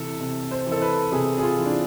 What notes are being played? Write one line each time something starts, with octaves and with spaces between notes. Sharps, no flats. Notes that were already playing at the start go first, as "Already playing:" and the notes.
Already playing: C3 E3 A4
C3
C5
E3 A4
B4
C3 G#4
G#4
F4
E3
D4